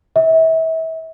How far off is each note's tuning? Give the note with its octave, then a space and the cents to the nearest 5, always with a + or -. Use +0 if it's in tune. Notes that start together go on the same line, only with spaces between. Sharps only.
E5 -30